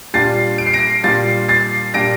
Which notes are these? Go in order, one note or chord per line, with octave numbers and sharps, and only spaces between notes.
A#2 G3 D4 F4 A6 C7
D7
C7
A#6 D7
A#2 G3 D4 F4 A6 C7
A6 C7
A#2 G3 D4 F4 A#6 D7